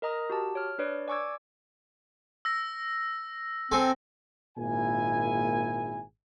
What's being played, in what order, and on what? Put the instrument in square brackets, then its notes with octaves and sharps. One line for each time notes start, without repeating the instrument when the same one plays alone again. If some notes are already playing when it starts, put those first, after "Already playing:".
[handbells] A#4 D#5 A#5 D#6
F#4 G4 A5
C#5 F6
D4 B4 C#5 D5
D5 G#5 C#6 D6 E6 G#6
[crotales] E6 A#6
[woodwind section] C4 [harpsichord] A4 G#5 C6
[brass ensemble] G#1 A#2 A#3 E4 G#4 G#5